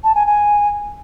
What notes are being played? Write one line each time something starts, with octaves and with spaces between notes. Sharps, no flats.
A5
G#5
G#5